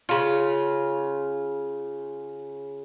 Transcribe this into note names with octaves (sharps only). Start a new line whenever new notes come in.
C#3 F4